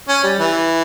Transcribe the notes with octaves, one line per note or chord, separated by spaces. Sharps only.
C#4
G3
E3